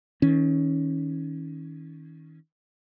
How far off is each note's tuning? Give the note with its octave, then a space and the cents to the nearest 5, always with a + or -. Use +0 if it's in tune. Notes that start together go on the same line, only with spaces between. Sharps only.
D#3 +35 C#4 +0